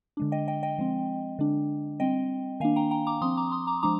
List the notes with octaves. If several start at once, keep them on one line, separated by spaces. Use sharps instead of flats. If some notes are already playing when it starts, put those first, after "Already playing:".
D3 G#3 D4
D#5 G5
D#5 G5
D#5 G5
F3 G#3 C4
D3 G#3 D4
G3 C4 D#5 G5
D#3 A#3 D4 F5 G#5
G5 A#5
G5 A#5
A#5 D6
F3 C4 C6 D#6
A#5 D6
C6 D#6
A#5 D6
F3 G#3 D4 A#5 D6